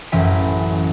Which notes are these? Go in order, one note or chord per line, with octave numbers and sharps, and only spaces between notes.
A1 F#2 E3 G5 B6